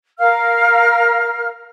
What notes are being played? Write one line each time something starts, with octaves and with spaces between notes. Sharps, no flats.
A#4 F5 F6